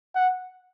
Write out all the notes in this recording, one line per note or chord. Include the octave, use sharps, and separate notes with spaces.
F#5